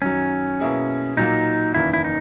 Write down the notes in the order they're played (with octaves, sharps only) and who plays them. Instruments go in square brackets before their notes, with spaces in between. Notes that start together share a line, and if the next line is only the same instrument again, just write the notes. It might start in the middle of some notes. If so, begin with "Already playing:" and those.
[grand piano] F#2 D#3 F#3 [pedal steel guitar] C#4
[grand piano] B2 A#3 E4 G#4
[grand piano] A#2 F#3 A#3 [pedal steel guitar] D#4
[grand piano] F#1 E2 D#3 A#3 [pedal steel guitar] E4
[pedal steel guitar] E4
D#4